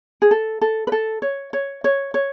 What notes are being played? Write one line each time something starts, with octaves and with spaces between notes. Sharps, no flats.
G#4
A4
A4
B4
A4
C#5
C#5
C#5
C#5